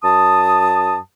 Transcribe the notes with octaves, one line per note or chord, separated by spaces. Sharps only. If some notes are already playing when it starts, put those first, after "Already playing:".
F#2 A5 D#6